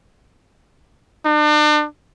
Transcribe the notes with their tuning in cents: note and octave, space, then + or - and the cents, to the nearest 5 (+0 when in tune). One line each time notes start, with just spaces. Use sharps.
D4 +40